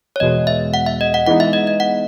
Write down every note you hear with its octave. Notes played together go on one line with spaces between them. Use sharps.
C#5
E2 B2 G#3 D#5
E5
F#5
E5
D#5
F#5
E3 G#3 B3 D#4 F#5
E5
D#5
D#5
F#5